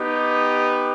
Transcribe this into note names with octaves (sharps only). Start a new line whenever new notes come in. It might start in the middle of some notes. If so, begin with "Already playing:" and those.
Already playing: B3 D#4 G4